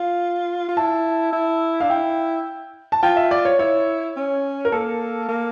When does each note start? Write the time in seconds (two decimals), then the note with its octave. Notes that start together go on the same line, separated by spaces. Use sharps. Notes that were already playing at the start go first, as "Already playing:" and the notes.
Already playing: F4 F5
0.68 F4
0.77 E4 A5
1.33 E4
1.80 D4 F5
1.89 E4 G5
2.92 A5
3.03 F4 G5
3.17 E5
3.31 D5
3.45 C#5
3.59 E4 C#5
4.16 C#4
4.65 A#4
4.72 A#3 A4
5.29 A#3